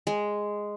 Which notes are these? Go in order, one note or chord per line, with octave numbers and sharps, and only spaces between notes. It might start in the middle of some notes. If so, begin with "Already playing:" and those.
G#3